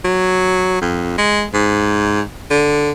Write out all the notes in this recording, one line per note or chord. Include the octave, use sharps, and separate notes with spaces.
F#3
F2
G#3
G#2
D3